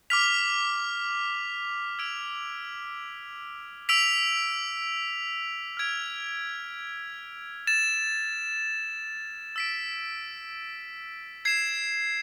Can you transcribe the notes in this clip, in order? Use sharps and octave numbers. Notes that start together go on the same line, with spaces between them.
D6 F6 B6 F7
E6 G#6 D7 F7
E6 B6 D7 F7
F6 G#6 D7 F7
A6 E7
E6 B6 D7
G#6 C7 E7